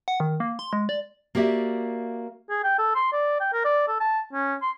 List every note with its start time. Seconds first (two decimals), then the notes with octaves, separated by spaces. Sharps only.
0.08 F#5
0.20 D#3
0.40 A#3
0.59 C6
0.73 G#3
0.89 D5
1.35 A#3 F#4 G4 D5 E5
2.50 G#4
2.64 G5
2.78 A4
2.95 C6
3.12 D5
3.40 G5
3.53 A#4
3.65 D5
3.88 A4
4.00 A5
4.33 C#4
4.62 C6